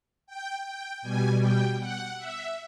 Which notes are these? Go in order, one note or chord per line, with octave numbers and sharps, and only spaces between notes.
G5
G5
B2 G3 G#5
G5
F#5
E5